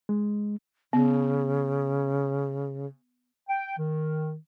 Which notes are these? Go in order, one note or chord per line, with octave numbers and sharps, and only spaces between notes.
G#3
C#3 B3
G5
D#3